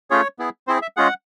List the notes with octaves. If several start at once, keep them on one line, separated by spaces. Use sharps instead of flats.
A3 C#4 F4 G#4 C#5
B3 E4 G#4
C4 E4 G#4 C5
E5
G#3 C#4 F4 G#4 F#5